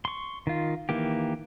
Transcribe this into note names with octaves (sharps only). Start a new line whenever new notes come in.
C6 C#6
D#3 F4
D#3 E3 A#3 G4